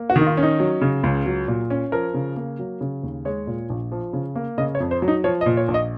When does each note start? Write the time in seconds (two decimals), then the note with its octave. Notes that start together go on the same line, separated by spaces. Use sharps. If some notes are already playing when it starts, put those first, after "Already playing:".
Already playing: A#3
0.10 F#4
0.16 D#3 D#4
0.26 F4
0.37 C#4
0.43 D#4
0.60 F#3
0.81 C#3
1.03 C#2
1.26 F#3
1.48 A#2
1.70 C#4
1.92 F3 A#4
2.14 C#3
2.36 A#3
2.59 F#3
2.81 C#3
3.03 D#2
3.25 G#3 C#5
3.47 A#2
3.70 A#1
3.92 F3
4.13 C#3
4.35 A#3
4.58 C#3 D#5
4.75 C#5
4.80 F2
4.91 C5
5.02 F#3
5.08 D#4
5.24 F3 C#5
5.41 D#5
5.46 A#2
5.57 C#5
5.68 A#1
5.74 D#5